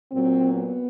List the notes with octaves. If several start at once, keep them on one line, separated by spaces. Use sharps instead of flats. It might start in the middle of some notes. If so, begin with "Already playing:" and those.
A#2 F#3 C4
B3